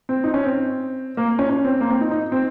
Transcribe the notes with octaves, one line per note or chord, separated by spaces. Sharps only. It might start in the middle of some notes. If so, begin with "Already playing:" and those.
C4
D#4
C#4
C4
A#3
C#4
C#4
C4
A#3
C4
D#4
D#4
C4